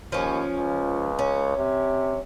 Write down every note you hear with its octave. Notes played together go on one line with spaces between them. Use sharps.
D#2 F3 C#4
C#2
C#4
C3